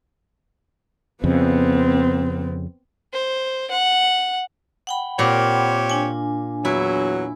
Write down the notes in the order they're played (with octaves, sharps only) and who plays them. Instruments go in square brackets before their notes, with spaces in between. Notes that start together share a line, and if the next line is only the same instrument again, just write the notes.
[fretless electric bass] F2 C#3 [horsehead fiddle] B3 C4
[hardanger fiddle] C5
F#5
[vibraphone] F#5 G5 B5
[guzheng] A#2 [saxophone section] C4 G4 C#5
[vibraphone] D4 G#5
[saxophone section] E2 F#3 [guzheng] E4